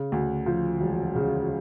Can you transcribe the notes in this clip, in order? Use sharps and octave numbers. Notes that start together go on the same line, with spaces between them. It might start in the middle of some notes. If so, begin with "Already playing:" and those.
Already playing: C#3
D2
F3
E1
C#3